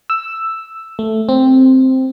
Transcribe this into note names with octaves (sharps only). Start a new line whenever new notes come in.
E6
A3
C4